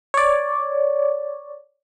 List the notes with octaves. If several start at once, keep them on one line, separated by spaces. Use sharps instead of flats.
C#5 D5